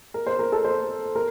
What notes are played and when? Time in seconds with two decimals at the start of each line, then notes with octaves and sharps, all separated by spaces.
0.14 A#4
0.27 C5
0.39 A#4
0.52 A4
0.65 C5
1.16 A#4